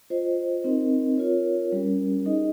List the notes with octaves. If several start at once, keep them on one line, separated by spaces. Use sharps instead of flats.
F4 C5 D#5
C4 D#4 A#4 D#5
F4 A#4 C#5
G3 C#4 G4 A#4
D#4 G#4 D#5